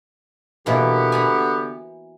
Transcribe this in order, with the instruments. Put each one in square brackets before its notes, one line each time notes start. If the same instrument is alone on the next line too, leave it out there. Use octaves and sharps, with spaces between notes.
[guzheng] B2 E3 A#3 [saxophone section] D3 B3 G4
[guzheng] G#5 A#5 B5